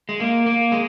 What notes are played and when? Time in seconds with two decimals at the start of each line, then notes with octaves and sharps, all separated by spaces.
0.09 G#3
0.20 A#3
0.46 A#3
0.72 G#3